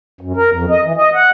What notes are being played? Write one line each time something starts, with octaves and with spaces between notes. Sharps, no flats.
F#2
A#4
F2
D#5
E3
D#5
F#5